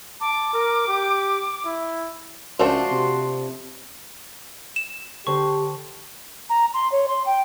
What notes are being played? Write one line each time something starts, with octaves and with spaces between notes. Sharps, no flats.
A5 D6
A#4
G4
E4
C#2 F3 A3 D4 F#4 C6
C3
E7
D3 G4 C5 C#6
A#5
C6
C#5
C6
G5